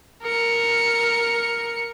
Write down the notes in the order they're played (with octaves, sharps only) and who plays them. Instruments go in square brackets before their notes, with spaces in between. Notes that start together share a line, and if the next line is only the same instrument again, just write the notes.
[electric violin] A#4 C#7